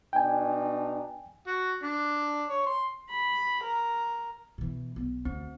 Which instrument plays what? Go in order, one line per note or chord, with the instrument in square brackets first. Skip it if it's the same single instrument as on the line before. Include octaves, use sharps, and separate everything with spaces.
[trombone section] B2 D4 D#4 [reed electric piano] G5 G#5
[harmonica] F#4
D4
C#5
C6
[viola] B5
A#4
[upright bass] B2 E3
B1 B3
[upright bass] D2 [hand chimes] C4